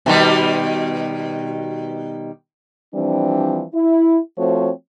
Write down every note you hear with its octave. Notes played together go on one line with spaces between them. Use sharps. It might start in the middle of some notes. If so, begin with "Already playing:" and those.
B2 D#3 G3
E3 F3 G3 C4 D4
E4
F3 A3 C4 F#4 C5 C#5